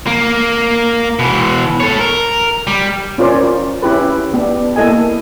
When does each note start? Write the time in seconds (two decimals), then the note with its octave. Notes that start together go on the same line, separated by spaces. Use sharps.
0.07 A#3
1.19 B2 E3
1.80 A4 C#5
1.99 A#4
2.67 G3
3.18 C#4 F4 A#4 C5 D5
3.43 F4
3.82 C#4 E4 G4 B4
4.34 B3 D4 G4
4.76 A#3 E4 A4 D#5 G#5